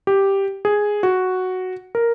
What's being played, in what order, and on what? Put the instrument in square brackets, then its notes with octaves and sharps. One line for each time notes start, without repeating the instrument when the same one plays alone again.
[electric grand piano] G4
G#4
F#4
A#4